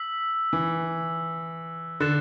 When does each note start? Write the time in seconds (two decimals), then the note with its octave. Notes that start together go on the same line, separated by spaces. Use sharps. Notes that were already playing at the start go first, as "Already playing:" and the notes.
Already playing: E6 B6 F#7
0.53 E3
2.00 D3 F#6 A6 E7